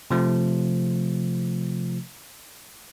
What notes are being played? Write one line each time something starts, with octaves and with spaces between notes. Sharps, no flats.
C3 F3 A3